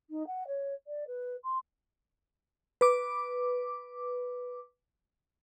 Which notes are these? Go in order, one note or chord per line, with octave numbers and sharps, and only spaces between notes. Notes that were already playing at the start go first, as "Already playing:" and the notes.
D#4
F#5
C#5
D5
B4
C6
B4 D6